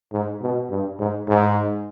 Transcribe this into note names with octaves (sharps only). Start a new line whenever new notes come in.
G#2
B2
G2
G#2
G#2